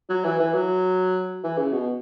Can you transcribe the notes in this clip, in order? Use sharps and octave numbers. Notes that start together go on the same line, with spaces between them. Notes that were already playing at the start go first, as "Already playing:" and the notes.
F#3
E3
E3
F#3
E3
C#3
B2